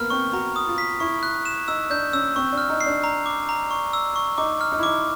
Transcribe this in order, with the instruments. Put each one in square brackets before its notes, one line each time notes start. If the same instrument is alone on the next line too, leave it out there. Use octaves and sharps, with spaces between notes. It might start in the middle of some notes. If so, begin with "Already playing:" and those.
Already playing: [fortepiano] A#3 B3 [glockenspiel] F6
[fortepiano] C4 [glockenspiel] C#6
[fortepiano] F#4 [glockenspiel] A#5
[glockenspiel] D#6
[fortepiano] F4
[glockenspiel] B6
[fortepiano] E4 [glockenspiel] C#6
[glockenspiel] F#6
E7
[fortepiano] D#4 [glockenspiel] E6
[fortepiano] D4 [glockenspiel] G6
[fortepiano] C#4 [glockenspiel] E6
[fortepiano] C4 [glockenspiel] C#6
[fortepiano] D4
[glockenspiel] F6
[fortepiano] D#4
[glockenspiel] C7
[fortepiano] D4
[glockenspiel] A#5
D6
A#5
C#6
E6
C#6
[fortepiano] D#4 [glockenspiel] D6
[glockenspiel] F6
[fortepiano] D#4
E4
[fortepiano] D#4 [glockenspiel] D6